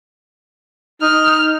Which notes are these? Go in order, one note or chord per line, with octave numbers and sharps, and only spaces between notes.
D#4 F6